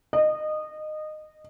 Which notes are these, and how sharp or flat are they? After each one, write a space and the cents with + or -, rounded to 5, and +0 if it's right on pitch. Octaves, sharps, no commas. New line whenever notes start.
D#5 -20